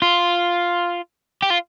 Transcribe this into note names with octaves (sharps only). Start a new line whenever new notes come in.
F4
G4
F4